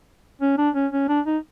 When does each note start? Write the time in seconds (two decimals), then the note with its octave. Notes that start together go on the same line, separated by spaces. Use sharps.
0.41 C#4
0.58 D4
0.75 C#4
0.93 C#4
1.09 D4
1.26 D#4